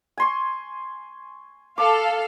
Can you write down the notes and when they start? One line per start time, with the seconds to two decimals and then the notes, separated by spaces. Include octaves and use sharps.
0.17 G#5 C6 C#6
1.78 A4 F5 D6